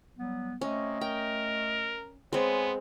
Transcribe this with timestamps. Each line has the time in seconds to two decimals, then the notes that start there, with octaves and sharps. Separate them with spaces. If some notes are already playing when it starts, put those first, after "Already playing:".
0.17 F#3 G3 B3
0.61 C3 A3 C#4 D#5
1.01 A#4 G5
2.33 G#3 B3 C4 C#5 G#5